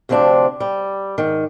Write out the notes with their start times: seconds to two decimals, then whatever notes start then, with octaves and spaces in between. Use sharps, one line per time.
0.09 D2 C3 F3 C4 D4
0.60 G3
1.18 G#2 D#3